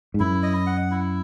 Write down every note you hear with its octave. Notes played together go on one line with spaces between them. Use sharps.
G#2
F#2 E4
D#5
F#5
E4